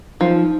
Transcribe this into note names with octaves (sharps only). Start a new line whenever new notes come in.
F3 D#4